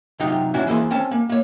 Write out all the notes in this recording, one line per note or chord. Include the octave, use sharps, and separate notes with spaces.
C3 F#3 D#4 F4 G4
C#4 D4 E4 F#4
E3 A#3 E4 G#4 C5
C4 C#4 A5
A#3
A#3 C#5